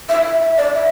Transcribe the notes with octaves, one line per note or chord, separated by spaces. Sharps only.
E5
E5
E5
D5
E5